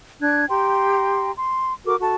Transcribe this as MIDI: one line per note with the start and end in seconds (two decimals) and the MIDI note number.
0.21 0.44 62
0.21 0.44 90
0.21 0.44 92
0.48 1.31 67
0.48 1.31 79
0.48 1.31 82
0.48 1.31 84
1.35 1.72 84
1.84 1.94 66
1.84 1.94 69
1.84 1.94 70
1.84 1.94 86
2.00 2.15 66
2.00 2.15 69
2.00 2.15 81